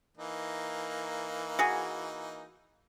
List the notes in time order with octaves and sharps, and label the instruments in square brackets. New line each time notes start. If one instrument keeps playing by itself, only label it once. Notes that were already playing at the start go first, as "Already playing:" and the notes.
[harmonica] E3 A#3 D#4
[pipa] F#4 G#4